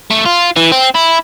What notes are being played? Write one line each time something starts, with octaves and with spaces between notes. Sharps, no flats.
A3
F4
E3
C4
E4